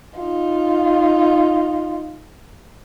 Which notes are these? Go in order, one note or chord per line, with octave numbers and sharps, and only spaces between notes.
D#4 F4